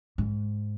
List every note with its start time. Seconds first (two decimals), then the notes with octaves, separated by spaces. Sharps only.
0.18 G#2